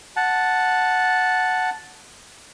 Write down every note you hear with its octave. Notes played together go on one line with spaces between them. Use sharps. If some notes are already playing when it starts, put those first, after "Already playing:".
F#5 A5